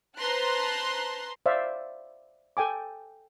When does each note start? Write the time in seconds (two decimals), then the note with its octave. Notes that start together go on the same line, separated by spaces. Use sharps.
0.18 B4 C5 A5 A#5 C6 F#6
1.46 C5 D5 E5 F5
2.57 A4 G5 G#5 D6